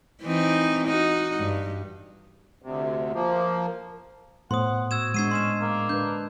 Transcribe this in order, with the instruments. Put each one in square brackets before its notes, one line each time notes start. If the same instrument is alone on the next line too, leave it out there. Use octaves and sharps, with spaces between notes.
[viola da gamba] E3 C4 D#4
D#4 F#4
G2
[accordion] D2 C3
F3 A#3
[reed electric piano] A2 [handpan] B3 C5 [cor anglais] F#5 [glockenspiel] C6 D#6
[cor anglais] F#4 [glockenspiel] E6 G#6 E7
[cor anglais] F#3 [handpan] G#3 D4 [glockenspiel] G#6 C7 D#7
[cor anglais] C#4 [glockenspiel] C6 E7
[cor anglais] A#3
[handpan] D4 B4 [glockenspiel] G6